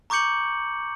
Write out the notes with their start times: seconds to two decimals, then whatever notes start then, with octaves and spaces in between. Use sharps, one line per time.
0.10 A#5 C#6 D6 G6 C#7 F#7